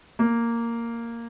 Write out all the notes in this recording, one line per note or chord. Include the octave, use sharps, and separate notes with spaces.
A#3